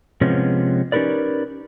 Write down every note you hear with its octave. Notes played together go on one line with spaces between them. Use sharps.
C3 F3 G#3 B3 C#4
C#4 D#4 G4 A#4 B4 D5